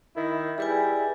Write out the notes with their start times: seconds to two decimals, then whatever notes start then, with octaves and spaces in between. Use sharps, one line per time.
0.16 D#3 E4
0.58 G3 E4 G#4 B4 G#5